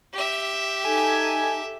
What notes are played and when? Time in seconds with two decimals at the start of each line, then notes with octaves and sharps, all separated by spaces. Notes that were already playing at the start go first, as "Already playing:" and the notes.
0.13 G4 E5
0.85 D#4 A4 G#5